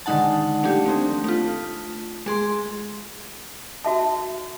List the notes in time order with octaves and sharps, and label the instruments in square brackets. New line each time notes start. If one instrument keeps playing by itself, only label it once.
[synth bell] D3 D#3 G#3 D#4 F#5 A5
F3 A3 D4 G4
A3 C4 D4
A3 F4
G#3 G#4 C6
[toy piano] F#4 E5 A5